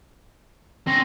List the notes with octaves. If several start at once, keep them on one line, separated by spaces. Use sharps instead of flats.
C4 C#4 A#6